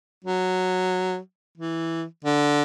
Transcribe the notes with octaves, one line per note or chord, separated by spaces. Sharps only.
F#3
E3
D3